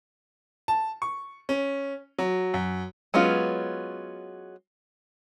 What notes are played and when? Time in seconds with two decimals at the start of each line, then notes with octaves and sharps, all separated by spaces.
0.68 A5
1.02 C#6
1.49 C#4
2.19 F#3
2.54 F#2
3.14 F#3 G#3 B3 C#4 F4